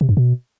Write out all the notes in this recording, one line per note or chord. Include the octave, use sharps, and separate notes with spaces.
C3
G2
B2